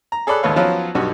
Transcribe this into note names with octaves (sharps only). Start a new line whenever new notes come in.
A#5
G#4 A4 C#5 D5 B5 F#6
G#1 D#2 A3 B4 C#5 F5
F3 F#3 B3 C#4 F4
B1 G2 F#4 G4